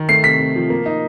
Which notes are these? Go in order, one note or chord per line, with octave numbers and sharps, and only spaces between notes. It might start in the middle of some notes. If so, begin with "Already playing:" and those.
Already playing: D#3
A3 C7
C3 B6
C3
F3
A#3
D#4